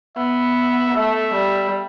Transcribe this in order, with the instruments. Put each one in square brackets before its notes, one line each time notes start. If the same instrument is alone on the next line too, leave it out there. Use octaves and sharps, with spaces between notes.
[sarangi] B3 [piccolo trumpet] E5
[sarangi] A3 [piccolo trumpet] E5
[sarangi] G3